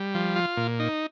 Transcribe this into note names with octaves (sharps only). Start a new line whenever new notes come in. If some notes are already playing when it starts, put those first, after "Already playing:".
Already playing: G3
F3
F4
A#2
D#4